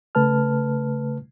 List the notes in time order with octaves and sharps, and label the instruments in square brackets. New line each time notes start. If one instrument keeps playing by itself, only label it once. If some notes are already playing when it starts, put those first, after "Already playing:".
[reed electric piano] C#3 A3 B4 A5 F6